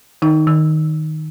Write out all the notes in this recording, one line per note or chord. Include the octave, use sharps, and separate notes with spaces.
D#3 D#4
D#3